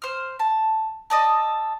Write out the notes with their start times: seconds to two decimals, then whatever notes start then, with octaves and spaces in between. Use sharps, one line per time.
0.02 C5 F6
0.39 A5
1.10 A4 D5 D#5